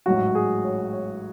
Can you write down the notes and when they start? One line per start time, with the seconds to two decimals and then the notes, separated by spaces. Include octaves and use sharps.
0.06 A1 G#2 F#3 F#4
0.35 G#4
0.65 C#5
0.93 C#5